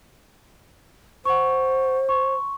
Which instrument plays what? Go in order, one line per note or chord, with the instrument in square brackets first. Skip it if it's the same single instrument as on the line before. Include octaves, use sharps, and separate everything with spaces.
[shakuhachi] C5 [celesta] F#5 C#6
[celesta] C6 C#6